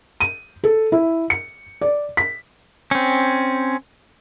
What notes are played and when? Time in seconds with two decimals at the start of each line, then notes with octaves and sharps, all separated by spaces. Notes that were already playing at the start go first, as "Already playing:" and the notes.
0.21 D#7
0.64 A4
0.92 E4
1.30 C#7
1.81 D5
2.17 B6
2.91 C4 C#4